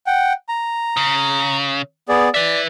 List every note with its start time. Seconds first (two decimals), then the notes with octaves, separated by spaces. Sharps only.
0.06 F#5 G5
0.49 A#5
0.97 C#3
2.09 B3 G#4 D5
2.34 B4 D5 E5